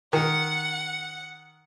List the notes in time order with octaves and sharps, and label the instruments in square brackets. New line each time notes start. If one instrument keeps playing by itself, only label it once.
[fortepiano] D#3 [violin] F#5